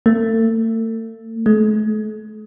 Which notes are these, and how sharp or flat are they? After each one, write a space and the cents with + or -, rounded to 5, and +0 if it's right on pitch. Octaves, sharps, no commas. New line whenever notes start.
A3 +40
A3 -45